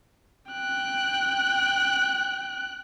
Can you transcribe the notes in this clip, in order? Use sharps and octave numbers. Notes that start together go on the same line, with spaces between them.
G5 F#6